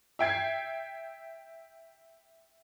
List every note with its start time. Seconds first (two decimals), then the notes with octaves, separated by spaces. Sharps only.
0.19 E5 G5 G#6 C7